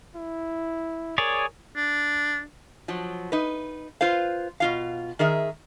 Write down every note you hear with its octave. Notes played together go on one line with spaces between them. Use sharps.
E4
G#4 A#4 C#5 D5
D4
F3 F#3
D#4 B4
F4 B4 C5 F5
B2 F4 F5
D#3 G#4 A#4 E5